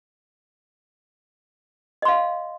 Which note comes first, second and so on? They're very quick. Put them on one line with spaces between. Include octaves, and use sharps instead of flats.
D#5 C6 F5